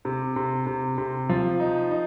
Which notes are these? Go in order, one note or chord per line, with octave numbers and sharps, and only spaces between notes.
C3
C3
C3
C3
F3
D#4
D#4